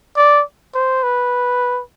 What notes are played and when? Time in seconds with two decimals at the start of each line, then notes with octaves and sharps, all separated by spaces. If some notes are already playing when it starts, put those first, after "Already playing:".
0.17 D5
0.75 C5
1.03 B4